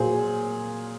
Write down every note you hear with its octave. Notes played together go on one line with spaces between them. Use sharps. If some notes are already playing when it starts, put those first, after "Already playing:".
Already playing: A#2 F#3 G#4 C5